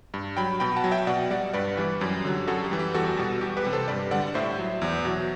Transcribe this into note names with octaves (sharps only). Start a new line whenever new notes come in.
G2
F#3 G5 B5
B2 G5 B5
F#5 A5
F#3
E5 G5
B2 D5 F#5
G3 D5 F#5
G2 B4 D5
E3 G3
F#2 G4
D3 F#3
F#2 F#4 A4
G4
E3 G3
G4
E2 F#4 A4
B2 G3
E2 G4
G4 B4
C3 G3
A4 C5
G2 B4 D5
D3 G3 D5 F#5
A2 C5 E5
F#3
E2
B2 F#3